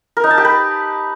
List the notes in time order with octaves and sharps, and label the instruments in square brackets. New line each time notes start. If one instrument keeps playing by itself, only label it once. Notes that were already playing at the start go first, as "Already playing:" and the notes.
[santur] A#4
D#4
A5
G4
B4